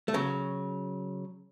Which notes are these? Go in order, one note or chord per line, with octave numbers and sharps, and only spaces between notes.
A3
C#3 F#3